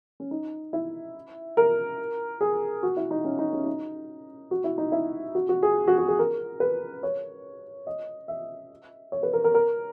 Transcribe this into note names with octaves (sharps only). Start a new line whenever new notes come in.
C#4
D#4
E4
A#4
G#4
F#4
E4
D#4
C#4
D#4
C#4
D#4
F#4
E4
D#4
E4
F#4
F#4
G#4
F#4
F#4
G#4
A#4
B4
C#5
D#5
E5
C#5
B4
A#4
A#4
A#4